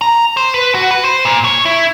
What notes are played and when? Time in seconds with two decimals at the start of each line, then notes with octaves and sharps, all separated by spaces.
0.01 A#5
0.37 C5
0.54 B4
0.75 F#4
0.91 B4
1.04 C5
1.25 A#2
1.44 C#5
1.65 E4